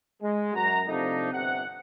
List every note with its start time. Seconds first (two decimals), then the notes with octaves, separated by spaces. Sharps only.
0.21 G#3
0.54 F#2 F#4 A#5
0.86 C3 F3 A3 D4 D#4
1.31 G1 C3 C4 F#5